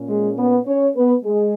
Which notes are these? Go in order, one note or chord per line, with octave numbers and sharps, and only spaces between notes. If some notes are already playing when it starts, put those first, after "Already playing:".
Already playing: A#2 C#4
G#3 G#4
B3 B4
C#4 C#5
B3 B4
G#3 G#4